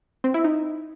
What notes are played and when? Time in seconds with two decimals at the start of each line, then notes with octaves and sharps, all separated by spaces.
0.24 C4
0.34 E4
0.44 D#4